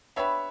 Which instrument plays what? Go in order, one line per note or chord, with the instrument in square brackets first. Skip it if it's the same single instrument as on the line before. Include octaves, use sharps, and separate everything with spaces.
[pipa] B3 D4 G4 B4 [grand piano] C#5 E5